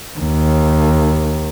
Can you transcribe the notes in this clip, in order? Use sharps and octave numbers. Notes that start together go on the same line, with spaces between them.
D#2